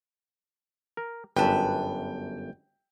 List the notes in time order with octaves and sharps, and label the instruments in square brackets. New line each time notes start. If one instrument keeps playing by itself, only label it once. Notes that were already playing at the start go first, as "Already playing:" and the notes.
[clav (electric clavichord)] A#4
[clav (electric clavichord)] G1 F#2 [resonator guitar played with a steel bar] B4 A5 [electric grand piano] G5